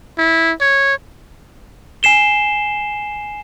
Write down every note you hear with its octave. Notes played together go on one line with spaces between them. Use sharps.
E4
C#5
G#5 C7 E7 G7